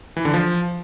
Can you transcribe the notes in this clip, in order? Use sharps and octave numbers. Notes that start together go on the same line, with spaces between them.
E3
D3
F3